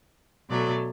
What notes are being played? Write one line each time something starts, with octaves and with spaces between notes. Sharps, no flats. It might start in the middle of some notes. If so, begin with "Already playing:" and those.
B2 F#3 A3 D5